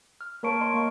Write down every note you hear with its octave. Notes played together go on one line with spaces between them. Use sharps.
F6
A#3 A#4 C#5 A5 C#6 D7
D#5 C6 C#6
A#3 C#6